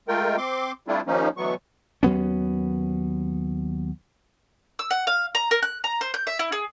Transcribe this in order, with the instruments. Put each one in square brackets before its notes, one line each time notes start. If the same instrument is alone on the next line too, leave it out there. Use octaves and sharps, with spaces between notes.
[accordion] G#3 A3 F4 A#4 G5
C4 C6 D6
G3 A3 C4 D4 E4 F4
D#2 F3 A#3 C#4 D#4
D2 B2 E3 F#3 B3 C#6
[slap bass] D#2 F#3 B3 C#4
[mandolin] E6
F#5
F5
A#5
A#4
F#6
A#5
C5
G6
E5
E4
G#4